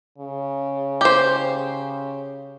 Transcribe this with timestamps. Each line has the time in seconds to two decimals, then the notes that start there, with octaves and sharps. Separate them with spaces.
0.18 C#3
1.01 G4 C5